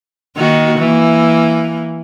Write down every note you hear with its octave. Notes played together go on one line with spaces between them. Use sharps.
D#3 A#3 F#4
E3 A#3